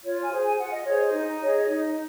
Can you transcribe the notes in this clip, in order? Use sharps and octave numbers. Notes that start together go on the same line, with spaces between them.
F4 C#5
G#5
G#4 C5
G#5
F4 F#5
D#5
G#4 C5 C#5
D#5
D#4
G#4 C#5
D#4